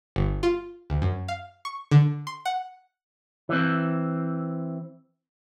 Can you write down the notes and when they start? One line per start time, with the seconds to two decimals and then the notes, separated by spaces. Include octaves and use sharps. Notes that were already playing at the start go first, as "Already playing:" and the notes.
0.16 G1
0.43 F4
0.90 D2
1.02 F#2
1.28 F5
1.65 C#6
1.91 D3
2.27 C6
2.45 F#5
3.49 E3 C4